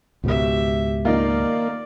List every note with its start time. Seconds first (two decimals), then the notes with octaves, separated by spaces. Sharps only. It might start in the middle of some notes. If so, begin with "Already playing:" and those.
0.24 C#2 G#2 B2 G4 E5
1.05 D#3 A#3 D#4 F4 D5